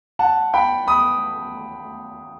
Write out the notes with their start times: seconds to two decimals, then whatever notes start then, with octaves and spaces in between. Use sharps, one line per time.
0.19 F#5 A5
0.54 G5 B5
0.87 B5 D#6